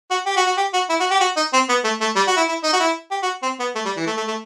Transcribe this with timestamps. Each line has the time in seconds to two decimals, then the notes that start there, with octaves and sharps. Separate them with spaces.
0.10 F#4
0.26 G4
0.36 F#4
0.47 F#4
0.57 G4
0.73 F#4
0.89 E4
1.00 F#4
1.11 G4
1.20 F#4
1.37 D#4
1.53 C4
1.69 B3
1.84 A3
2.01 A3
2.16 G3
2.27 F#4
2.37 E4
2.49 E4
2.63 D#4
2.73 F#4
2.80 E4
3.11 G4
3.23 F#4
3.43 C4
3.60 B3
3.75 A3
3.85 G3
3.97 E3
4.06 A3
4.17 A3
4.28 A3